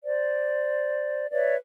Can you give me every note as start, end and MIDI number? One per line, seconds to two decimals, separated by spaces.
0.04 1.28 72
0.04 1.28 74
1.32 1.56 71
1.32 1.56 73
1.32 1.56 74
1.32 1.56 76